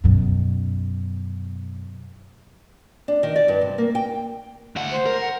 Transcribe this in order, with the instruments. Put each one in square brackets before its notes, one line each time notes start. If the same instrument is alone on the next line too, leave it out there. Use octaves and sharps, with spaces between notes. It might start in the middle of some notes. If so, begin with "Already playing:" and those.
[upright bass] F#2 B2
[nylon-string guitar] D4
D#3
D5
G2
C3
A#3
G5
[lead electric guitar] D2 F#5
[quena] C5
[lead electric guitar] A#4
[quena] F#5